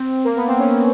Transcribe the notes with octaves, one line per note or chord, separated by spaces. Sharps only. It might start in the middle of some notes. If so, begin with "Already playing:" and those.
Already playing: C4
A#3
B3
C4
C#4